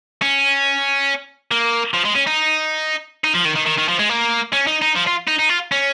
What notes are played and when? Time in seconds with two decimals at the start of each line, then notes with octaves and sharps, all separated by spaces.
0.22 C#4
1.51 A#3
1.94 F3
2.05 G#3
2.15 C#4
2.27 D#4
3.24 D#4
3.34 F3
3.45 D#3
3.56 D#3
3.66 D#3
3.78 D#3
3.88 F3
3.99 G#3
4.09 A#3
4.53 C#4
4.67 D#4
4.82 D#4
4.96 F3
5.07 F4
5.28 D#4
5.39 D#4
5.50 F4
5.72 C#4